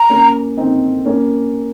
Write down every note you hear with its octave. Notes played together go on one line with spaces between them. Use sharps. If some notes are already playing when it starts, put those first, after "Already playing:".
Already playing: A#5
A#3 C#4
C4 D#4
A#3 C#4